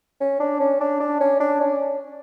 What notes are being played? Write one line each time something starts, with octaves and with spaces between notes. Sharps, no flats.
C#4
D4
C#4
D4
D4
C#4
D4
C#4